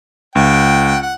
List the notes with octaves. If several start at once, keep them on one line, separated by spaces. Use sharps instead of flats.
C#2 F#5 G5
F#5